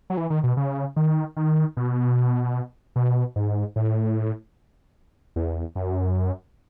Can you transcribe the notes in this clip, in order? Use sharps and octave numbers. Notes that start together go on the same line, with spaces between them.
F#3
E3
D#3
B2
C#3
D#3
D#3
B2
B2
G#2
A2
E2
F#2